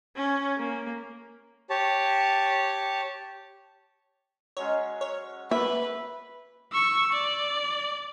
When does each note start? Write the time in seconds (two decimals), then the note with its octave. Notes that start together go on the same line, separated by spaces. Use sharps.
0.17 C#4
0.59 A#3
1.70 G4 C#5 A5
4.57 F#3 G#3 C#4 C#5
5.01 C#5
5.51 A#3 B4 E5
6.72 C#6 E6
7.13 D5